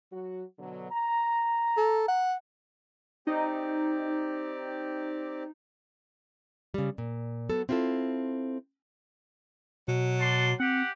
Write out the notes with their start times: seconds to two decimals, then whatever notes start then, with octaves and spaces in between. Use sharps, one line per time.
0.11 F#3 F#4
0.58 B2 D3 F#3
0.91 A#5
1.77 A4
2.08 F#5
3.27 C4 D#4 G4 D5
6.74 C#3 G3
6.98 A#2
7.49 F#3 B3 A4
7.69 C4 E4 F4 G4 A4
9.88 B2 F#3
10.20 D5 A5 C6
10.60 C4 G4 F#5